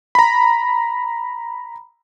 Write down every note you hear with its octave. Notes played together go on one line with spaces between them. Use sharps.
A#5 B5